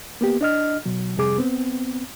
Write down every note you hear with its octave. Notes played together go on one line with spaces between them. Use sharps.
A#3 B3 G4
D4 D#5 F6
B2 F#3
F2 C3 G3 G#4 D6
B3 C4